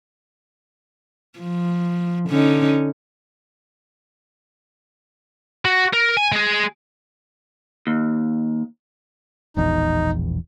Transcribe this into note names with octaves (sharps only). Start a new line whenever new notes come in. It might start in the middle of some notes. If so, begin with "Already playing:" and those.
F3
D3 C#4 D#4
F#4
A#4
G#5
G#3 G#4
D#2
E1 A#1 E2 D#4